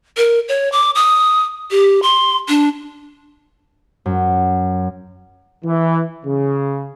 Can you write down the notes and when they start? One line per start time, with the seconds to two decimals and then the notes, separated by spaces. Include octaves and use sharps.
0.17 A#4
0.48 C#5
0.72 D6
0.95 D#6
1.71 G4
2.02 C6
2.48 D4
4.06 F#2
5.64 E3
6.26 C#3